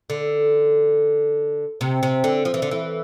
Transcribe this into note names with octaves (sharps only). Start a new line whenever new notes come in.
D3
C3
C3
D3
F3
E3
D3
E3